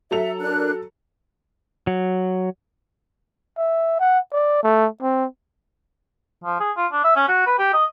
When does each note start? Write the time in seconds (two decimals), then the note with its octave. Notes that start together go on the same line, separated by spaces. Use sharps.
0.11 F#3 A4 E5 F7
0.40 D4 A#4 F#6
1.87 F#3
3.57 E5
4.00 F#5
4.32 D5
4.63 A3
5.01 C4
6.44 F3
6.60 G#4
6.77 F4
6.92 D4
7.04 E5
7.16 C#4
7.28 F#4
7.46 B4
7.58 G4
7.73 D#5